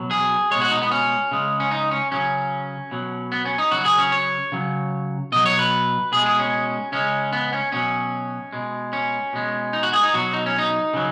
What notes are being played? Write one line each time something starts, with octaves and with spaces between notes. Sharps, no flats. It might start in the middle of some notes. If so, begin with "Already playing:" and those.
Already playing: B2 F#3
G#4
B2 G#3 C#5
F#4
D#4
B3
C#4
C#3 G#3
C#4
D#4
C#4
C#3 F#3 C#4
B2 F#3
B3
C#4
D#4
C#3 F#3 F#4
G#4
C#4
C#5
C#3 F#3
B2 F#3 D#5
C#5
B4
B2 G#3 G#4
G#4
C#4
C#3 G#3 C#4
B3
C#4
B2 F#3 C#4
B2 G#3
C#4
B2 G#3
D#4
F#4
G#4
D#4
B2 F#3 F#4
D#4
C#4
D#4
C#3 F#3